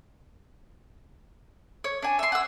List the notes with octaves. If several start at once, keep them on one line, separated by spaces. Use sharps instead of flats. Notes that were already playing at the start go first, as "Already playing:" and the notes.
C#5
D4 G#5
E5 C6
F#5 E6